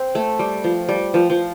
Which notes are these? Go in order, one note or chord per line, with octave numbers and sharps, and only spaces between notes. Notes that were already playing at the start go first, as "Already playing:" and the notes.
Already playing: C4
A3
G3
F3
G3
F3
F3